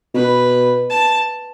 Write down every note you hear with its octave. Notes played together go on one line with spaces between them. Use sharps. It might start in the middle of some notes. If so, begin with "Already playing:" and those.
B2 B4
A5